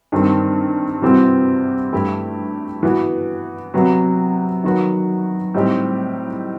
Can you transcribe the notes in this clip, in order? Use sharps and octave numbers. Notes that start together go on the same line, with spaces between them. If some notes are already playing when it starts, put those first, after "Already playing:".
G2 D#3 G3 C4
C3 E3 G3 C4 F#4
G2 E3 A3 E4 G4
E3 B3 F#4
C3 F#3 B3 F#4
D#3 F#3 B3 F#4
A2 G3 C4 D#4 G4